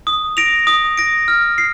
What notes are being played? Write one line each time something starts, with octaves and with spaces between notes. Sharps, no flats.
D#6
A#6 D7 F7
D#6
A#6 D7
F6
C7